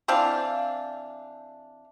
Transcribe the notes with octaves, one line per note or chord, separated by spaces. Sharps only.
E3 C4 D4 F5